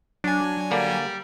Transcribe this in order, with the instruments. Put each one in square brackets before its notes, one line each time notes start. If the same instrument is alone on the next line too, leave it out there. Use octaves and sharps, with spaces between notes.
[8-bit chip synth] F#3 G#5 [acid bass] D4
[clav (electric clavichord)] D3 A#3 [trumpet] G3